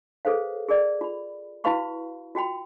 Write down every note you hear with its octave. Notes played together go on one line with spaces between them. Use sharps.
G#4 A4 B4 C5 F5
G#4 A#4 D5
F4 B5
E4 F#4 B4 F5 B5 C#6
F4 F#4 G5 B5